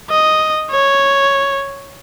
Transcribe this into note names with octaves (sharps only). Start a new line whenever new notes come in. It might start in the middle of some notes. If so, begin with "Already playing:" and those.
D#5
C#5